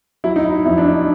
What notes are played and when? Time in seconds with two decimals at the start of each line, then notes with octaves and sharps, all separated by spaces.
0.24 F#3 E4
0.36 D#4
0.45 E4
0.66 F2 E4
0.78 D4
0.86 D#4